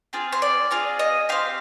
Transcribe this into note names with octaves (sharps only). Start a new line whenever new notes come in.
C4 F4 G#4
C5
D5
C4 F4 G#4
D#5
C4 G4 F5